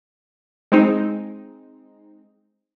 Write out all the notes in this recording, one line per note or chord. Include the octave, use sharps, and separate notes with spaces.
G#3 C4 D#4